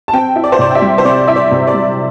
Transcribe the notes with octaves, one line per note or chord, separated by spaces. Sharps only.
A5
C4 G5
E4
D5
C5
C3 D5
G5
E5
G3
C5
C4 D5
E4 E5
D5
C3
D5
G3